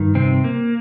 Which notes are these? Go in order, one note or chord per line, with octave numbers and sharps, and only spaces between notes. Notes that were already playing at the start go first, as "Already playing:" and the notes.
Already playing: G2 D#3
C3 C4
A#3